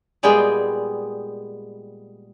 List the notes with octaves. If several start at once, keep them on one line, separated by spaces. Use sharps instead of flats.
A#2 G3 G#3 B3 G#4 G5